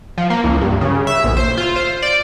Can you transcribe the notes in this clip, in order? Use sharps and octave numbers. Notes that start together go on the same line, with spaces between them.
F3
A#3
C#2
G2
C#3
E5
A#1
C5
F4
C5
D5